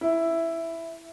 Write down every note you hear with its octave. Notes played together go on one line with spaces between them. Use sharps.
E4